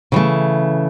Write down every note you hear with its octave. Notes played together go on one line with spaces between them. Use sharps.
C#3 E3 A3